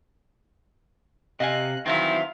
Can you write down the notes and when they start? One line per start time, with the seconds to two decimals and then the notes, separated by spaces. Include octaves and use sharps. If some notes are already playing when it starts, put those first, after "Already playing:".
1.40 C3 D#5 F5 G#5 F#6
1.86 D#3 E3 F#3 C4 E4 E5 F5 C6